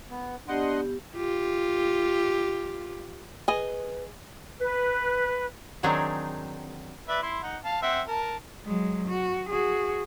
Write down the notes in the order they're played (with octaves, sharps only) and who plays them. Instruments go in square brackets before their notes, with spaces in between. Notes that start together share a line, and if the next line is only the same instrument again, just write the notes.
[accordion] B3
[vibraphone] B3 G4 [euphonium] D4 [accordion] D#5 F#5 C6
[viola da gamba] F4 G4
[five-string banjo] G#4 D#5 [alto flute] B4
[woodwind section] B4
[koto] D#3 F#3 C4 D4 D#4 G#4
[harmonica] B4 D5 E5
E4 C6
D#4 F#5
F5 A5
C4 E5 F#5
A#4 A5
[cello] F#3 G#3
F#4
F#4 G#4